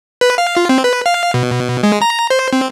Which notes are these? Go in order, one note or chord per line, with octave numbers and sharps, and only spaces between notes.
B4
F5
F4
C4
B4
F5
B2
G#3
A#5
C5
C4